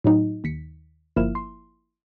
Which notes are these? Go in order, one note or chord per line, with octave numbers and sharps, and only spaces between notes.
A2 F#3 D#4
D#2 B6 C#7
G1 F3 A#3 E4 F6 E7
C6